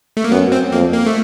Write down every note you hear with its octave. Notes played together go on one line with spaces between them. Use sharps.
A3
A#3
F#2 B3
C4
F2 A#3
A#3
A3